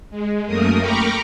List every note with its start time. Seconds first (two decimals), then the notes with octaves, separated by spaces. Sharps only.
0.10 G#3
0.46 F#2 A3 A#3 A#4 D#6
0.78 G5 A#5 B5 C#6 D6 F6